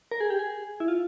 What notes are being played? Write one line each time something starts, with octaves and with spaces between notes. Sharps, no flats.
A#4
G#4
G4
G#4
E4
F4